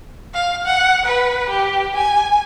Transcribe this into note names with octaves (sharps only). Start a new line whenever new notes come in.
F5
F#5
B4
G4
G#5